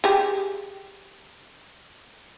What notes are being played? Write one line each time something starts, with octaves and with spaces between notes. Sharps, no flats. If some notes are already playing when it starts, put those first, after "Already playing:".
G4 G#4